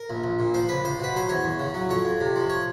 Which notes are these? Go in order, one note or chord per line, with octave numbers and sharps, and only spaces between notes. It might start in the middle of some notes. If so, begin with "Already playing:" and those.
Already playing: A#4
A#1
A#1
A#2
F3 C5
C#2 B4
C#2 C5
B2 B4
F#3 C5
E2 C#5
E2
C#3
F#3
F2 C#5
F2
C3
F3
C#5